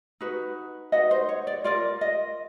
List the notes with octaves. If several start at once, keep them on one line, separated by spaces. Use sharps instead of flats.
D#4 F#4 B4
D#4 F#4 B4 D#5
C5
C#5
D5
F4 A#4 D5
D#5